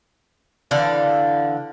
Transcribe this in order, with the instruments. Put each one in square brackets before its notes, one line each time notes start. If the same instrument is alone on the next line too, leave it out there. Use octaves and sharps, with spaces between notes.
[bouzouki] D3 E3 D5 F5